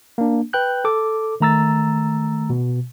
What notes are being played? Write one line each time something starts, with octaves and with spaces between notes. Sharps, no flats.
A#3 D4
B4 G5 F#6 G6
A4 D6
D#3 A3 A#5 E6 A6
B2